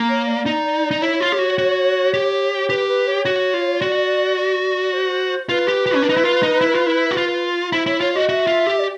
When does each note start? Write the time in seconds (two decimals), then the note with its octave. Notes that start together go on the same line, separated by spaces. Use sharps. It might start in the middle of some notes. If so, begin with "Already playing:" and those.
Already playing: A#3
0.09 C#5
0.27 D5
0.46 D#4
0.91 D#4
1.01 E4 C#5
1.20 F4
1.32 G4
1.39 F#4
1.58 F#4
2.14 G4
2.69 G4 B4
2.88 B4
3.07 C#5
3.25 F#4
3.54 F4
3.81 F#4 D5
4.37 D5
4.93 C5
5.49 F4 B4
5.68 G4
5.86 G4
5.95 C#4
6.02 D4
6.09 D#4
6.17 E4
6.24 F4
6.43 D#4
6.61 E4
6.74 F4
6.86 E4
7.11 F#4
7.17 F4
7.72 E4 C5
7.86 E4 C#5
8.01 F4 C#5
8.15 F#4 D#5
8.29 F#4 E5
8.47 F4
8.67 G4
8.80 D5